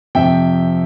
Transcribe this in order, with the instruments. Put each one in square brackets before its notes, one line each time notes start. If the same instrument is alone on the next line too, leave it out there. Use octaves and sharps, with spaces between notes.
[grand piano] F2 C3 F3 E5 G5